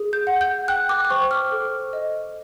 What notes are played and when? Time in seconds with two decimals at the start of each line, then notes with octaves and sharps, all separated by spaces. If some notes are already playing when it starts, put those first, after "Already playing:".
Already playing: G#4
0.13 G6
0.27 F#5
0.41 G6
0.68 G5 F#6
0.89 D6
1.05 D6
1.10 C5 C#6
1.31 F6
1.52 A4
1.93 D#5